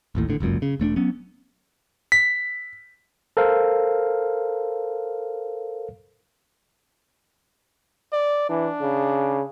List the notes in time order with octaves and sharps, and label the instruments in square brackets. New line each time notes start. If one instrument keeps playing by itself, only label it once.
[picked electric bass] A1 D#2 A2
G#1 A2 D3
G1 C#2 F#2 A#2
C#3
E1 A3 C4 D4
F#3 B3 C#4
[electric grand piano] B6
[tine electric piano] A4 A#4 C5 F5
[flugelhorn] D5
[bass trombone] E3 [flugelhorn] D4
[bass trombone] C#3